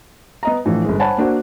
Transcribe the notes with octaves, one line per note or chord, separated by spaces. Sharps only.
B3 D#5 A#5
A2 E3 F3 D4
G1 G#3
C5 C#5 F#5 G#5 A5 B5
A#3 D4 F#4 C5 F#5